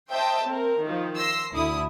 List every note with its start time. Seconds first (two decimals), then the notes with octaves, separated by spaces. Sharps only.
0.11 C5 D#5 E5 G5 A5 C6
0.44 C4 A#4
0.81 D#3 F3
1.16 C6 E6 A#6 C7
1.53 D2 D3 E4 D#6